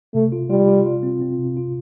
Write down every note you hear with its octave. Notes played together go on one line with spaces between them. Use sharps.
C3 A3
F4
G3 F4
F4
F4
C4
C4
C3
F4